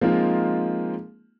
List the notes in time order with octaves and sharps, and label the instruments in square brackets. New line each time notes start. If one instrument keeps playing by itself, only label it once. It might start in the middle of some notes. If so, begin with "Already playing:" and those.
[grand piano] F3 G#3 A#3 C4 D#4 F4